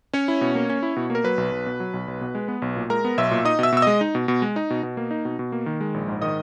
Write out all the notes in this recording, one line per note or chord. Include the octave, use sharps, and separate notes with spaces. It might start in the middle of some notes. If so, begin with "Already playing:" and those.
C#4 C#5
E4
B2
A#3
C#4
E4
B2
A#3
A#4
F#3 B4
B1
B1
B2
F#3
B1
B1
B2
G#3
B3
B1
A#2
G#3 A#4 A#5
B3
B1 E5 E6
A#2
D#4 D#5 D#6
B2 E5 E6
B2 E6
G#3 D#5 D#6
D#4
B2
B2
G#3
D#4
B2
B2
A#3
D#4
B2
B2
A#3
D#3
G#3
A#1
G#2
D#3 D#5 D#6